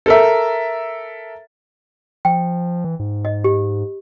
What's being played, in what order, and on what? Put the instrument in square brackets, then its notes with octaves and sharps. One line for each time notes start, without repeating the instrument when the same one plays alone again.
[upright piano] A4 A#4 E5
[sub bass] F3 [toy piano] G5
[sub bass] E3
G#2
[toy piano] D#5
G4